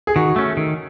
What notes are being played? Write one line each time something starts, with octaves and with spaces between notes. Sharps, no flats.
G#4
D#3 F#4
A3 C#4
D#3